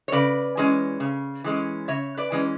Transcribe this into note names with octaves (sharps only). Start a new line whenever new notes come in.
C#5
C#3 B4 D5
E3 G#3 C#4
C#3
E3 G#3 C#4
C#3 C#5 E5
B4 D5
E3 G#3 C#4